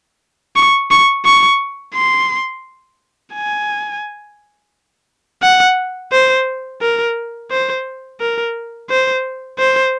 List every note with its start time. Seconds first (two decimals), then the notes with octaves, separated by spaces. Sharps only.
0.56 C#6
0.91 C#6
1.25 C#6
1.95 C6
3.34 G#5
5.42 F#5
6.12 C5
6.81 A#4
7.51 C5
8.20 A#4
8.90 C5
9.59 C5